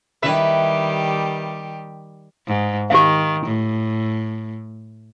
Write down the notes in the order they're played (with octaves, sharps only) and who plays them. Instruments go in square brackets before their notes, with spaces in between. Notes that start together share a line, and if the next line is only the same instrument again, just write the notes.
[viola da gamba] D#3 G3 G4 [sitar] E4 B4 E5
[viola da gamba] G#2
[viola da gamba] D#3 [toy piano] G4 F5
[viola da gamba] A2